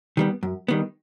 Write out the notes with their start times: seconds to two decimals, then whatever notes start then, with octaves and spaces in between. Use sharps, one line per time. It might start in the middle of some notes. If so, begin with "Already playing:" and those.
0.17 D#3 G3 B3
0.43 F#2
0.68 D#3 G3 B3